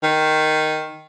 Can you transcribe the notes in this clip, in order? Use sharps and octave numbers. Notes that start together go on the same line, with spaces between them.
D#3